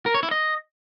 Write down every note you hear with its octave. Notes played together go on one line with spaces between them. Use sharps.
A#4
C#5
E4
D#5